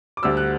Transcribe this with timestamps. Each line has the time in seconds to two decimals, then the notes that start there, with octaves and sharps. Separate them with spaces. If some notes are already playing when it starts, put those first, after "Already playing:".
0.17 D6
0.22 D2 D3 G3 E6
0.37 F#6